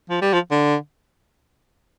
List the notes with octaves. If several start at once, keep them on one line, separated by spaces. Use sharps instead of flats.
F3
G3
F3
D3